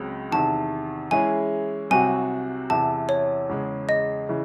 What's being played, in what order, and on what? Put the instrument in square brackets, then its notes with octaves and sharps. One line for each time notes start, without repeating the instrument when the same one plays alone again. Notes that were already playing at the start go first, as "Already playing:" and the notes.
Already playing: [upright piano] C#2 C#3 F#3 C4
[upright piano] E2 C3 D#3 [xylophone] A5
[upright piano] E3 G#3 C#4 E4 G#4 [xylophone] G#5
[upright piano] C2 C3 F#3 C4 F#4 [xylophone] G#5
[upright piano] E2 C3 E3 [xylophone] A5
[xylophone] C#5
[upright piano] E2 C#3 G#3
[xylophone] D#5
[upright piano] C#3 E3